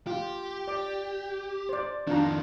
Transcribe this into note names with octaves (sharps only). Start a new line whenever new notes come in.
F4 G4
D5 D6
C5 D5
F2 D#3 D4 F4 A#5